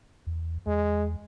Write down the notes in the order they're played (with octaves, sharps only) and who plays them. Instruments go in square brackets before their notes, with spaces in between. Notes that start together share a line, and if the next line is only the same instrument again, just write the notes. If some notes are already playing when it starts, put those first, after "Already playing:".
[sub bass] E2
[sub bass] E2 [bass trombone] G#3